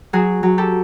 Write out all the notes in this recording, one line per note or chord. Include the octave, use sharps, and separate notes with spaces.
F#3 F#4 G#4
F#3
G4 A4